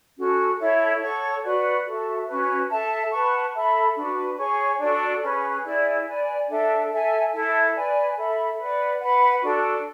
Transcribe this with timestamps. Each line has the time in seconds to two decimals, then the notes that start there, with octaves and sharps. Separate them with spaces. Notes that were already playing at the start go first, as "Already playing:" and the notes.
0.17 C#4 F#4 A4
0.59 E4 A4 C#5 E5
1.01 A4 C#5 F#5 C#6
1.43 F#4 B4 D5 F#5
1.85 F#4 A4 E5
2.26 C#4 F#4 B4
2.69 A4 E5 A5
3.11 B4 F#5 A5 C#6
3.53 A4 E5 B5
3.96 D4 F#4 B4
4.37 G#4 C#5 G#5 C#6
4.79 D4 F#4 A4 D5
5.22 C#4 G#4 B4
5.64 E4 G#4 D5
6.06 B4 D5 G#5
6.48 D4 A4 E5
6.90 A4 E5 G#5
7.32 E4 A4 E5
7.74 B4 D5 G#5
8.16 A4 E5 B5
8.58 B4 D5 F#5
9.00 B4 F#5 B5
9.42 D4 F#4 A4